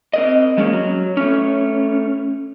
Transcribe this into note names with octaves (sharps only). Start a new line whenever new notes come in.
C4 A#4 D#5
G3 G#3 A#3 C#4
F#3
A3 C#4